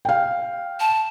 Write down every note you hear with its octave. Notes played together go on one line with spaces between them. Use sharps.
F5 G5
A5